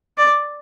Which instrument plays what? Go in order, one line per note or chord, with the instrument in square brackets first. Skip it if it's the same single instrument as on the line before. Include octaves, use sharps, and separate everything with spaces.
[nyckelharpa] D5